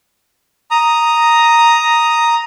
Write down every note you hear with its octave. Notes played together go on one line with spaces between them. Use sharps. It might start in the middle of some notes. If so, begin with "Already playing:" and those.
A#5 D#6